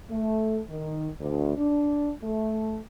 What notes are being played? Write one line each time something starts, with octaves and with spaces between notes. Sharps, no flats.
A3
D#3
D2
D4
A3